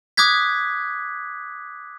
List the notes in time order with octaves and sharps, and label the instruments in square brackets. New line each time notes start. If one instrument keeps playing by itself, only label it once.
[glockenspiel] D6 D#6 F#6 G#6 B6